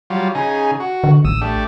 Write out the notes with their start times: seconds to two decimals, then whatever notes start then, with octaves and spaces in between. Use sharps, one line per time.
0.10 F#3 G3 F4
0.35 C#3 D#4 G#4
0.80 F#4
1.04 D3
1.25 A1 D#6 E6
1.41 A3 D4 G4